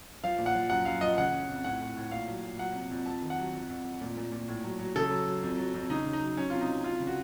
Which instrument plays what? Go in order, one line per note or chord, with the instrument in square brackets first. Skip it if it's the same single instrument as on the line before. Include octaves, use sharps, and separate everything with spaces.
[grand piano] F3 F5
A#2
F#5
F3
F#2 F#5
F#2 F5
F3 D#5
C#3 F#5
C#3
F2
A2 F#5
A2
A2
A#2 F5
F#3
A#2
F#3 F#5
C3
F2
F2 A5
D#3
F#5
F#3
F2
F2
F2
A#2
A#2
A#2
A2
F#3
F#3
C#3 A4
F#3
F#3
F2
F#3
F2
C#3 D#4
C#3
D#4
F#3
F#3 C#4
C3 F4
D#4
F#3
F2 F4
C#3
F#4